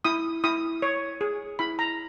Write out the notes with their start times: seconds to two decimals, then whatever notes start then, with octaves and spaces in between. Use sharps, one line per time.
0.05 E4 D#6
0.44 E4 D#6
0.82 C#5
1.21 G#4
1.59 E4 B5
1.79 A#5